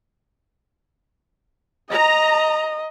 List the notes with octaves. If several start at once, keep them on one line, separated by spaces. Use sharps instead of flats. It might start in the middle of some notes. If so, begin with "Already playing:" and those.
D#5 A#5